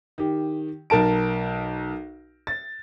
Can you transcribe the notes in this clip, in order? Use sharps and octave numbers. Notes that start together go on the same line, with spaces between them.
D#3 G4
B1 A#4 A5 D7
A6